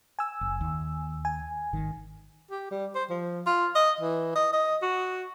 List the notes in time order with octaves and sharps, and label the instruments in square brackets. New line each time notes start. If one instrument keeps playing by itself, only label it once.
[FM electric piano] G#5 E6
[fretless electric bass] F#1
D#2
[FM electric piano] G#5
[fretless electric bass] G#1 D#3
[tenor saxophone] G4
G3
C5
F3
F4
D#5
E3
D#5
D#5
F#4